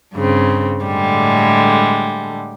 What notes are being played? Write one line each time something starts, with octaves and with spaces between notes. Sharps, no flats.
G2 C#3 C4
A2 D3 G3 G#3